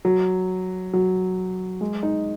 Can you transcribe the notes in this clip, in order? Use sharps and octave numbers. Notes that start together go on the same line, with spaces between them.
F#3
F#3
G#3
D#4